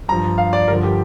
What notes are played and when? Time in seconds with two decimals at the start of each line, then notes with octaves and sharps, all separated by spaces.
0.08 G2 F3 A#5
0.38 F5
0.53 D5
0.68 G2 D3 F3 A#4
0.83 G4